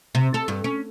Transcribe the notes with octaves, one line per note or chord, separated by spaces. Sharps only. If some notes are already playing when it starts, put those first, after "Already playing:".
C3
A4
G2
C#4